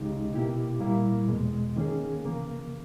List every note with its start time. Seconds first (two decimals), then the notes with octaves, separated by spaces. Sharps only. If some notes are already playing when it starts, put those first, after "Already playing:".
Already playing: C#2 C#3 G#3 D#4 G4
0.32 B2 A#3 E4 G4
0.80 A#2 G3 A#3 E4
1.28 E2 B2 G#3
1.76 D#3 A#3 C#4 G#4
2.23 C#3 E3 A#3